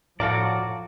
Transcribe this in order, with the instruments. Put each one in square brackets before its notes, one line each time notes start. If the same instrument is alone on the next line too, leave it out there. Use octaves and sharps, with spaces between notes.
[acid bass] A2 [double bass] F3 [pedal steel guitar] F#4 D5 [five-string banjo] A4 F5 A#5